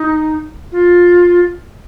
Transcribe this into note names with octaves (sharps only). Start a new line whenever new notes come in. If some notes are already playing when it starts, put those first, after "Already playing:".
Already playing: D#4
F4